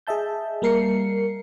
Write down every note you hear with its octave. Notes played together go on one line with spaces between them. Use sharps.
G#4 D#5 E5 A5 G6
G3 A#3 A#4 C7 C#7